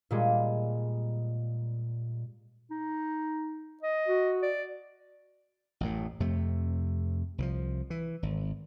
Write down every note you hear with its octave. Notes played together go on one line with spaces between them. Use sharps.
A#2 G3 G#3
D#4
D#5
F#4
D5
A1 F#2 A2
F2 C3 A3
C2 E3 F3
E3
G#1